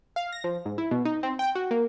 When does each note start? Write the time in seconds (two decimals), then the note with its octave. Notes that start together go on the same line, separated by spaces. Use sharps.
0.16 F5
0.32 A#6
0.44 F3
0.65 G#2
0.78 E4
0.91 B2
1.05 D#4
1.23 C4
1.39 G5
1.55 F#4
1.71 A#3